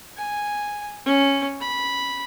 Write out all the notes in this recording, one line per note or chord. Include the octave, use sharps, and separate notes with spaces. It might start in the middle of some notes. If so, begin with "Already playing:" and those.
G#5
C#4
B5